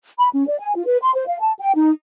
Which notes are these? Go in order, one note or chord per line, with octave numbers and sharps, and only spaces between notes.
B5
C#4
D5
G#5
F4
B4
C6
C5
F5
A5
G5
D#4